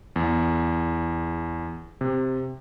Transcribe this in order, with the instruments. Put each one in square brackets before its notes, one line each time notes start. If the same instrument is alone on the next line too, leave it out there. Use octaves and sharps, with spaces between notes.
[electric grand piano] E2
C3